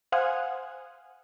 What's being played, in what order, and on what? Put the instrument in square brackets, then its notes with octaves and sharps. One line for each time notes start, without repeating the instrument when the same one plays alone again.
[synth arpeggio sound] C5 F5 F#5 G#5 D#6